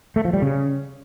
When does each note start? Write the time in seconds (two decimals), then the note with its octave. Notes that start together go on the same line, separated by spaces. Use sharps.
0.16 A3
0.25 F3
0.33 G3
0.42 C#3